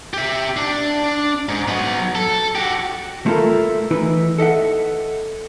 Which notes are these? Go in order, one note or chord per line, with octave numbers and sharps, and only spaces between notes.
G4 E5
D4
G#2
F#3 B3
A4
F#4 G4
A3 E4 F4 A4 A#4
E3 D#4 E4 B4
A4 D#5 E5 F#5